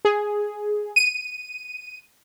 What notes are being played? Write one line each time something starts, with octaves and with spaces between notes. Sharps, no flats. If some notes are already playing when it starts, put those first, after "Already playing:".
G#4
D#7